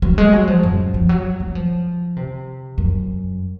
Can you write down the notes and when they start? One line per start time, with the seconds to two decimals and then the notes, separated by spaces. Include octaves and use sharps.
0.02 F#3
0.18 G#3
0.33 F#3
0.48 F3
0.63 F#2
0.94 F3
1.09 F#3
1.40 F#3
1.55 F3
2.17 C3
2.78 F#2